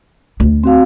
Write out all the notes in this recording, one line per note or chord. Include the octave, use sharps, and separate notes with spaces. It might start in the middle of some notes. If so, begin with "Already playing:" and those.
D2
C4 F#4 F5